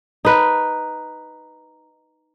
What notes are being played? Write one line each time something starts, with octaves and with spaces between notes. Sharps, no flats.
D#4 B4